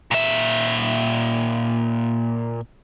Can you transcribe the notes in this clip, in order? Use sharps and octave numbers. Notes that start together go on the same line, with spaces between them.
A#2 E5